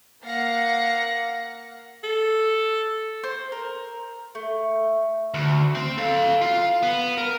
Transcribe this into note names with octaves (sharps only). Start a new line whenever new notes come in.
A#3 F5 F#5 A#6 C#7
A4
C5
A#4
A3
D2
C4
A4 F5
F4 F5
B3
A#4